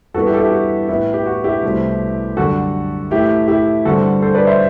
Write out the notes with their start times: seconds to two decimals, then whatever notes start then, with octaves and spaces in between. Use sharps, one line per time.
0.14 G2 E3 B3 F#4 A4
0.27 E4 G4
0.34 A4
0.39 E4 G4
0.51 F#4
0.88 A2 E3 B3 E4
1.14 G4
1.26 F#4
1.44 E4 G4
1.63 C2 B2 A3 C4
2.37 F#2 D3 G3 F#4 A4
3.11 A2 E3 A3 E4 G4
3.48 E4 G4
3.85 G2 D3 G3 C4 F#4 A4
4.22 A4 C5
4.35 B4 D5
4.47 C5 E5